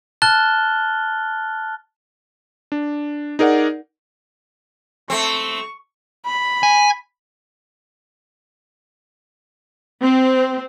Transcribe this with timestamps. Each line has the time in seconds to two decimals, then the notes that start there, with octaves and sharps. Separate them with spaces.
0.22 A5 F6 F#6 A6 G7
2.72 D4
3.39 D#4 G#4 A#4 D5 F#5
5.10 A3 C4 C#6
6.26 B5
6.63 G#5
10.02 C4